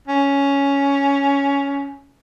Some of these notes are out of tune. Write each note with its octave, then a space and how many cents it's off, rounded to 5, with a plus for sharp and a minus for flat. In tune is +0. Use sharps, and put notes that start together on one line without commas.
C#4 +10